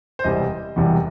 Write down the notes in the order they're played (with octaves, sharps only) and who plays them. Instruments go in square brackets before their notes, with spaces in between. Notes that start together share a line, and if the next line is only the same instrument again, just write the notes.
[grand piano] C5
E1 E2 C3 E3 G3 D#5
E1 E2 C3 E3 G3